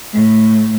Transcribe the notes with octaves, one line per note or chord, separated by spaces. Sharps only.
A2